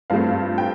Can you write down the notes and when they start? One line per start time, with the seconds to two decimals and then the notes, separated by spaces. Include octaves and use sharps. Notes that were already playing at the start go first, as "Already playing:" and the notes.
0.10 G2 F3 A3 C4 F5
0.58 G5